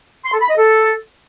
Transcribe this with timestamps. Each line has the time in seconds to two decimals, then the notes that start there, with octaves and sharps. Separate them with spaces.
0.25 C6
0.33 A4
0.41 B5
0.49 D#5
0.57 A4